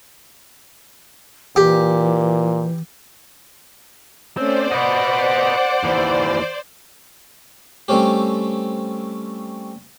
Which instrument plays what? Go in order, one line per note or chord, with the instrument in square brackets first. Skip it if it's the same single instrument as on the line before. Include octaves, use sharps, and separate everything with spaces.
[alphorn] A#2 [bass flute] E3 [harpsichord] G4
[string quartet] A3 C#4 [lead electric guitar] C4 [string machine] C5 D5
[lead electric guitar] B4 D#5 [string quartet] F#5 D6
[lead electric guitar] D#2 E3
[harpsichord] G3 A3 C4 C#4 G4